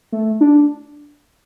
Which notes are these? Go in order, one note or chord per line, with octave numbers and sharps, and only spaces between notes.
A3
D4